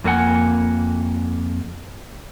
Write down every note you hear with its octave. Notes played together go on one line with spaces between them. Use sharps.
F2 A#3 C4 F#5 G#5